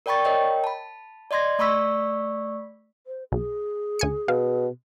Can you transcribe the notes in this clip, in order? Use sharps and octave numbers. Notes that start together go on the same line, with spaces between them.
A#4 D5 G5 B5 C#6 A6
A#4 C#5 D#5 G5
A5 B5
D5 D#5 C6 G#6 A#6
A3 D5 B5 C#6 E6 B6
C5
B1 G#4
D2 G#5 C#7
B2 F5